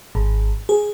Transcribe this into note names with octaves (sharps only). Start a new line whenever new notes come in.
G#1
G#4